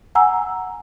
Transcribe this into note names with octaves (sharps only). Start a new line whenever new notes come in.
F#5 G#5 A#5 E6